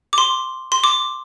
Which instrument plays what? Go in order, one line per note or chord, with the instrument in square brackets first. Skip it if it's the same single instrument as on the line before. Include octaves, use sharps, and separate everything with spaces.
[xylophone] D6
C6
C6
D6